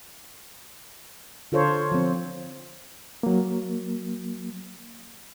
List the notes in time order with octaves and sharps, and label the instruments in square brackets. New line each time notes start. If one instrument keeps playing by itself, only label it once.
[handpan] D3 F4 A4 C5 C#5
F3 C4
[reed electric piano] F#3 A#3